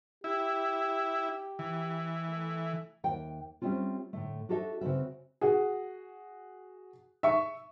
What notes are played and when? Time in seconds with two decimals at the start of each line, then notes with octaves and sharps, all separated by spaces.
0.24 E4 G4
1.59 E3
2.29 A3
3.04 D#2 E5 G5
3.62 G3 A3 C4 C#4 F4
4.13 A2 D3 A3
4.49 D4 F#4 G4 A4 D#5 E5
4.81 C#3 C4 F#4 B4 E5
5.41 F#4 G#4
7.23 E5 C#6